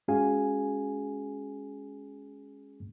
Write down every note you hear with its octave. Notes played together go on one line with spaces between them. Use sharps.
G#3 C#4 F#4 G#4 F5 G#5